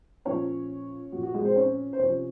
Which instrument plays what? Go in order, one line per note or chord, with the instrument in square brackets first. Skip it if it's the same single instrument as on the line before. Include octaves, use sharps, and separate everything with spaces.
[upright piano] A#2 F3 C#4 C#5
A#2 F3 F#4
F#4
G#3 G#4
C4 C5
C#4 C#5
C5
C3 F3 C#4 C#5